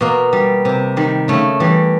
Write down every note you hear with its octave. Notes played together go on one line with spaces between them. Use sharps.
B2 A#3
G3
C3
D#3 G3
C#3 A3
E3 G3